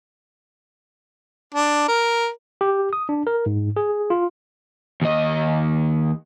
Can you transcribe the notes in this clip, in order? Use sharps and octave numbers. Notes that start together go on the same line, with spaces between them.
D4
A#4
G4
D#6
D4
A#4
G#2
G#4
F4
D#2 D#5